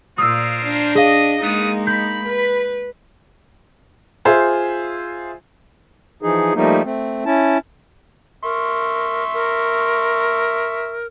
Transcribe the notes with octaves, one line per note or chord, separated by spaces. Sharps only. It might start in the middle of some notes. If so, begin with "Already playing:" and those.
A#2 F4 A#4 C5 D5 D#6 E6
D4
G#4 D#5 F5
G3 G#3 A#3 B3 D#4 D#6
B5 G6
B4
F4 G#4 C5 E5
E3 F3 D#4 G#4
F3 G3 A3 A#3 D#4
A3 C4
C#4 E4 A5
A#4 E5 C6 C#6
A#4